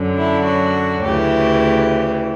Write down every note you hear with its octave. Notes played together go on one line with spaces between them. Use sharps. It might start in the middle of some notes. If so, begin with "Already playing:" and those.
Already playing: F#2 D3
E4
F#4
D2 C#3 E3 G4